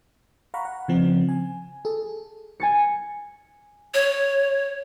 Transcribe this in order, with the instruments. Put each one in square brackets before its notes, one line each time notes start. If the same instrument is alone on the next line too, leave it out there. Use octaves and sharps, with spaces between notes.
[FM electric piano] F5 F#5 A#5 B5 C#6
F#5
C#3 F3 C4
G#5
G#4 A4
[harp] G#5 A6 C#7
[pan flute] C#5